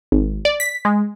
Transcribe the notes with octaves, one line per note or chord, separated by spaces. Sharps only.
G#1
D5
B6
G#3